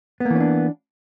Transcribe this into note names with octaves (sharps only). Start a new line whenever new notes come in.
E3 A#3 B3 C#4 D4